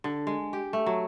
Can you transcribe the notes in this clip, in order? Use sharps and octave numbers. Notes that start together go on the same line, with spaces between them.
D3
G#3
G4
A3
F#3